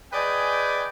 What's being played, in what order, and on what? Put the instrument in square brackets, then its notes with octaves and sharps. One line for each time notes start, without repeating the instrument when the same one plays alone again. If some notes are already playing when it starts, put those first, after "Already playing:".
[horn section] G#4 B4 D5 D#5 G5 G#5